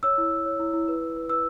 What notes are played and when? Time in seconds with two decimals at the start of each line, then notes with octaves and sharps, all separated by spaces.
0.03 C#5 E6
0.18 E4
0.31 E4
0.46 C#5
0.60 E4
0.73 E4
0.88 B4
1.02 B4
1.16 B4
1.29 B4 E6